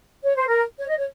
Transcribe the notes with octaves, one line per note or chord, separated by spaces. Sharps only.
C#5
C5
A#4
C#5
D#5
C#5